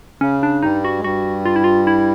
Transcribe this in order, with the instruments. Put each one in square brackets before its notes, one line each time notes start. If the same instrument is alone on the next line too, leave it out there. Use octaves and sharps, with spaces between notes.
[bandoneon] C#3 [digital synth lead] C#4
[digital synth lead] D4
[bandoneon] G2 G3 [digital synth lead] D#4
[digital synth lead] F#4
[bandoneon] G#3
[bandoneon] G2 G3 [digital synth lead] F#4
[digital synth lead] F4
E4
F4
E4